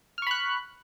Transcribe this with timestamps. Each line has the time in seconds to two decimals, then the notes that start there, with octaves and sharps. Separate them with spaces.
0.18 F6
0.22 C#6
0.27 B5
0.31 F#6